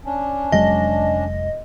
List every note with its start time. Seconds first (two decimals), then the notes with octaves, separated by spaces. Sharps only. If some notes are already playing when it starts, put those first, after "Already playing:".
0.06 C#4 D4
0.52 F1 F#3 G#3 D#5